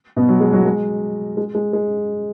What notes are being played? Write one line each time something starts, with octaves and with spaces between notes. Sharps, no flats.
B2 B3
F#3
G#3
F#3 F#4
G#3
G#3
G#3
G#3